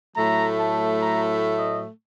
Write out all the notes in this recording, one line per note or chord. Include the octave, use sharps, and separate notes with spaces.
A2 F#3 A3 A#5
A5
A#5
D#5